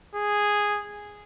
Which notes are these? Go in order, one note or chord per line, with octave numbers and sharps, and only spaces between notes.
G#4